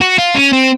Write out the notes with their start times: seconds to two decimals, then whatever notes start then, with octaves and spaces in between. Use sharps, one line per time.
0.01 F#4
0.18 F4
0.35 C#4
0.53 C4